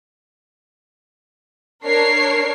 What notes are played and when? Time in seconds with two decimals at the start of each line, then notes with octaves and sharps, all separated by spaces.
1.84 D4 A#4 C#5 C7